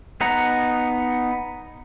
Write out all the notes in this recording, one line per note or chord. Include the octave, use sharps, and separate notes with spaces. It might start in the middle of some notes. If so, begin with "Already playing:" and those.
B3 D#4 F#5 A#5